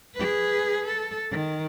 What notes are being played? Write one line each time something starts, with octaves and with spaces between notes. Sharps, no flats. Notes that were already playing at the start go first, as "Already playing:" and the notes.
G#4 B4
A4
D#3